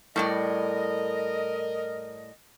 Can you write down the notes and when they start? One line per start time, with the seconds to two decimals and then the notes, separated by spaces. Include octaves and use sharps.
0.16 A2 G3 A#4 D5 D#5